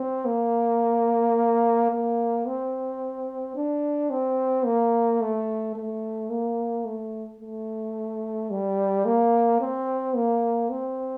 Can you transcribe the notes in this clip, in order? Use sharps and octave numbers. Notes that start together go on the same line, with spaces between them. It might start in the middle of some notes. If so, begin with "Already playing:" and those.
Already playing: C4
A#3
A#3
C4
D4
C4
A#3
A3
A3
A#3
A3
A3
G3
A#3
C4
A#3
C4